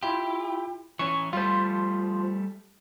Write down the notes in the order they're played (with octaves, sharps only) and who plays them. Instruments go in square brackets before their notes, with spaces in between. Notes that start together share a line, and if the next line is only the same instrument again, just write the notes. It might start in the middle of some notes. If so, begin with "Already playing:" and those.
[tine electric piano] E4 F4 [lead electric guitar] G4
[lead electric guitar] E3 C#4 [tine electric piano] C#6
[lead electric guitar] G3 A3 [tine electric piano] F4 C5